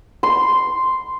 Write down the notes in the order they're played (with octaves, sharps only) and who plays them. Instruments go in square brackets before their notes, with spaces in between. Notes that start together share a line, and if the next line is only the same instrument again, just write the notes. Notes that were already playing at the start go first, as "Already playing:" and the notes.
[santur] C6